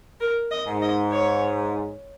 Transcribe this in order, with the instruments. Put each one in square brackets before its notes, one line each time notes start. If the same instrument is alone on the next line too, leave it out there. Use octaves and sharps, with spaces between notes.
[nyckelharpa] A#4
D#5
[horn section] G#2
[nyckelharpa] D#5
C#5